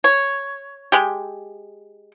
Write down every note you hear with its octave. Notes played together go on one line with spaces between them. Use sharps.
C#5
G#3 G4